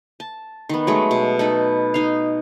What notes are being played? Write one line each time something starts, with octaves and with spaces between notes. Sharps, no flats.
A5
D#3 B3
F#3 G#3 A3
B2
D#4 A4 B4
D#4 F5